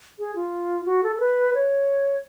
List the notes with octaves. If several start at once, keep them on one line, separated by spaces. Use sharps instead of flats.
G#4
F4
F#4
A4
A4
B4
C#5